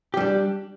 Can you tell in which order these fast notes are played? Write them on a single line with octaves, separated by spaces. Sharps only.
G4 G3 D4